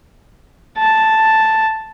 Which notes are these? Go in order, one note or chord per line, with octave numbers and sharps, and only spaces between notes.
A5